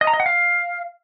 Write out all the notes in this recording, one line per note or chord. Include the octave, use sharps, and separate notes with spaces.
D#5
A#5
D#5
F#5
F5